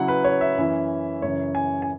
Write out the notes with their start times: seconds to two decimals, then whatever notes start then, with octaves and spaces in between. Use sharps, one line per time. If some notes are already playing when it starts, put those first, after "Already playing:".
Already playing: C#3 F#3 E4 F#5
0.08 B4
0.24 C#5
0.41 E5
0.57 F#2 E3 C#4 E4
1.22 F#2 C#3 E3 C#5
1.55 G#5
1.82 G#5